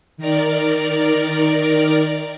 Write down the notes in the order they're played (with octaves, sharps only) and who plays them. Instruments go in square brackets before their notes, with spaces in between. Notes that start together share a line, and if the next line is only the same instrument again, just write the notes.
[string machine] D#3 A#4 D5